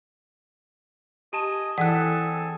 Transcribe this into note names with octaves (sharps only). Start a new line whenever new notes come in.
G4 D#5 G#5 A5 D#6 E7
E3 C4 E4 G#4 A4 F#5 G#5 F#6